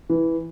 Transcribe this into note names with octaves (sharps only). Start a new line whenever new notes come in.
E3